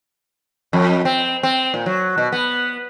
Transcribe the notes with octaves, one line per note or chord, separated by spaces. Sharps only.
F2
C4
C4
A#2
F#3
B2
B3